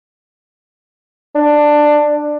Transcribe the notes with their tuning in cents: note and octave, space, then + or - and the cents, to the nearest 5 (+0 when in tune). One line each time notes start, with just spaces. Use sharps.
D4 +10